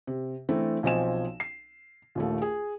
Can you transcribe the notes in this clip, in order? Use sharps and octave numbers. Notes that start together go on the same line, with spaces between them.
C3
E3 A3 C4 D4
B1 F3 C4 D#5 G#5 E7
C7
A#1 D#2 A3
G#4